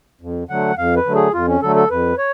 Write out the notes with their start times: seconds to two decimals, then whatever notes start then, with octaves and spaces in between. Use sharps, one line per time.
0.21 F2
0.49 D3 F#3 A3 F#5
0.77 F2 F5
0.96 B4
1.06 D3 F#3 A3
1.15 G#4
1.34 F2 F4
1.48 C#4
1.62 D3 F#3 A3 A4
1.76 A4
1.90 F2 B4
2.18 C#5